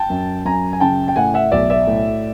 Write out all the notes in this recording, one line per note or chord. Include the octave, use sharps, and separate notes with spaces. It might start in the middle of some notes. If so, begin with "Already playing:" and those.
Already playing: G5 A5
F#2
F#2 G#5 A#5
G#5
C#3 G5 A5
G5
A2 F#5 G#5
E5 F#5
B1 D5 E5
D5 E5
A2